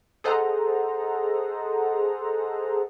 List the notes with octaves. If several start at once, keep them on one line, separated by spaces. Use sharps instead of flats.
G#4 A4 C5 D#5 F#5 A#5